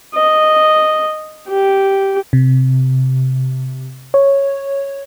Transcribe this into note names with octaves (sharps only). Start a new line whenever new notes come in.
D#5
G4
C3
C#5